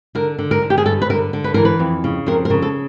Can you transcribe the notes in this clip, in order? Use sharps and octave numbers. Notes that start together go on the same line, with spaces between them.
D3 A#4
D3
A#4
D3
G4
G#4
G2 A4
B4
D3 A#4
D3
B4
E3 A#4
B4
F2
C#3
F2 A#4
A#4
C#3
A4